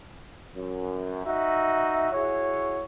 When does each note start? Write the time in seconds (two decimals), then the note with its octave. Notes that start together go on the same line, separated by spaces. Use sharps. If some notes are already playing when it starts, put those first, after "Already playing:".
0.56 F#2
1.25 D#4 F#4 E5
2.12 E4 F#4 G#4 C#5